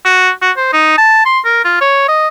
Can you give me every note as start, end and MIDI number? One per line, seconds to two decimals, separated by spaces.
0.05 0.30 66
0.42 0.51 66
0.57 0.71 72
0.73 0.94 63
0.98 1.24 81
1.26 1.39 84
1.45 1.63 70
1.65 1.79 65
1.81 2.03 73
2.08 2.28 75